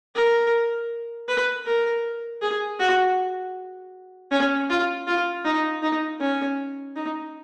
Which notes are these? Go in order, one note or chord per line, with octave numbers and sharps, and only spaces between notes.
A#4
B4
A#4
G#4
F#4
C#4
F4
F4
D#4
D#4
C#4
D#4